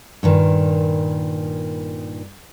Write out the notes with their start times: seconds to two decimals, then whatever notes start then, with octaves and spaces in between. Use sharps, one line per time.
0.23 G2 A#2 D#3